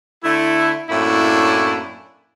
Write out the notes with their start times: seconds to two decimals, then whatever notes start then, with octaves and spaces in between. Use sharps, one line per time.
0.24 D3 A3 E4
0.90 F#2 A2 A#3 D4 E4